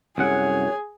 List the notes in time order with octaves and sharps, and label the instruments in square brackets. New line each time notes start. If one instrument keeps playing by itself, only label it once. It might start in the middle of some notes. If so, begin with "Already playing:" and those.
[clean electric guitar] C2 F#2 F#5 [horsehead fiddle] G#4 [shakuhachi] C#5